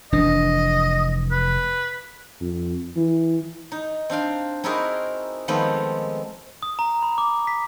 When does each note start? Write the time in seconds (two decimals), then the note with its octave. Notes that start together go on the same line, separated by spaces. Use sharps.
0.12 F1 E3 D4 D#5
1.31 B4
2.41 F2
2.97 E3
3.72 D#4
4.10 C4 D4 F5 G5
4.64 C4 D#4 E4 F#4 G#4 A#4
5.48 D#3 F3 G#3 A3 B3 C4
6.63 D#6
6.79 A#5
7.03 B5
7.18 D6
7.47 B6